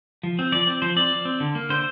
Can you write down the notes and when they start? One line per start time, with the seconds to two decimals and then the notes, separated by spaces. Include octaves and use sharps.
0.23 F3
0.39 C4
0.52 F3 D5
0.67 C4
0.82 F3 C5
0.96 C4 D5
1.12 F3
1.25 C4
1.40 D3
1.55 A#3
1.70 D3 C5